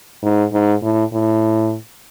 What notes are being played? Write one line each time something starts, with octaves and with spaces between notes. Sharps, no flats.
G#2
G#2
A2
A2